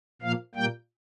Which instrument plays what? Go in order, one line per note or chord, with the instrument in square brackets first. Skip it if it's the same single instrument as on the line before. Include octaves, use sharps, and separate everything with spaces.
[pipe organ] A#2 F3 A#3 F5
A#2 G3 A#3 G5